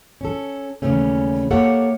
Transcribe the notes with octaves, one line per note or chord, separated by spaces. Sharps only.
C#4 A4
D#2 C#3 E3 G3 A3 C#4
A#3 G4 A4 C#5 E5 F#5